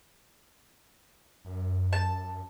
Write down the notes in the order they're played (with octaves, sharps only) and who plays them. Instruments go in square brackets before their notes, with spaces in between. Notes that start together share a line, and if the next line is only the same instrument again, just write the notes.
[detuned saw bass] F#2
[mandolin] A5